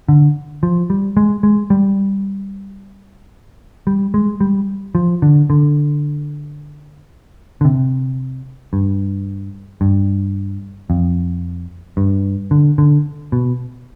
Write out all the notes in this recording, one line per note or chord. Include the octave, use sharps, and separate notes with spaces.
D3
F3
G3
G#3
G#3
G3
G3
G#3
G3
F3
D3
D3
D3
C3
G2
G2
F2
G2
D3
D3
B2